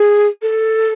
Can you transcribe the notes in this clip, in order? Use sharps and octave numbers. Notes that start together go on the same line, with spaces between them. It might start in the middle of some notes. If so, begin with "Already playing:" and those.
Already playing: G#4
A4